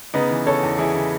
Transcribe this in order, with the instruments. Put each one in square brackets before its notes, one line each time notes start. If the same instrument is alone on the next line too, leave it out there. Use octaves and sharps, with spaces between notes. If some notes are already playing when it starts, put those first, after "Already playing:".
[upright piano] C#3 B3 D#4
E3
C#3 A4 C#5
E2
E3 E4 G#4
C#3